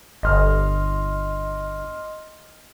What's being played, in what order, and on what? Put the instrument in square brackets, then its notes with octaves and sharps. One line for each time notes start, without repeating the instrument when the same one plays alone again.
[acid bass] G1 [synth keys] D#5 C6 F6